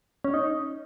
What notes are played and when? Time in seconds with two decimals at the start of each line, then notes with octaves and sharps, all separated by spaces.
0.24 C#4
0.34 D#4